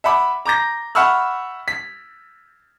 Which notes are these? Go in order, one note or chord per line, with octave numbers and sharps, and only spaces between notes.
E5 F#5 B5 D6
A#5 D6 G6 A#6
E5 F#5 B5 C#6 E6 F6
B6